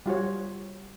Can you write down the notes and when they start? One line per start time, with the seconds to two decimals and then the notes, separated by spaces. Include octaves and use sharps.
0.06 G3 F4 F#4 C#5